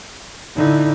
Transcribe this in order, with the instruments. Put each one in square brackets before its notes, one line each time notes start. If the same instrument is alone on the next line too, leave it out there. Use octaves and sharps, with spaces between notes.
[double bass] D3 E4 [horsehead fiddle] D#4